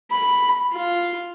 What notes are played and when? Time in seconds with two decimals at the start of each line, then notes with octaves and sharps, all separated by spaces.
0.11 B5
0.72 F4